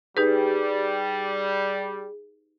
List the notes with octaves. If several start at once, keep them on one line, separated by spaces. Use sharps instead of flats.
G3 D#4 G4 G#4 B4